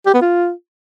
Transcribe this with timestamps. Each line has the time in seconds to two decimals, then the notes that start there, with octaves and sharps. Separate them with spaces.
0.06 G4
0.14 B3
0.21 F4